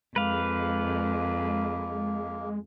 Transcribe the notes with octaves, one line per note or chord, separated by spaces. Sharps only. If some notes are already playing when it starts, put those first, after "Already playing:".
F2 G#3 A#3 B4 F5